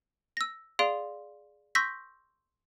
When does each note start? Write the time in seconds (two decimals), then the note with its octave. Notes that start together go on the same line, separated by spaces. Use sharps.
0.37 E6 A#6
0.79 G#4 D5 F5 C6 D7
1.75 C6 C#6 E6 G6 A#6 B6